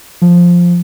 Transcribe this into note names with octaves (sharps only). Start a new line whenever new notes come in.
F3